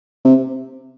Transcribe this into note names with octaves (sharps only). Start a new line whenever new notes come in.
C3